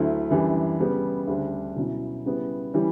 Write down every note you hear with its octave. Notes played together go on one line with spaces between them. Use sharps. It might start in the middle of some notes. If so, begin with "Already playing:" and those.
Already playing: D2 D3 F#3 A3 E4
F#2 E3 G3 D4
C#3 G3 B3
D2 C#3 G3 D4
B2 F#3 C#4 E4
C#3 G3 B3 E4
E3 G3 C#4 E4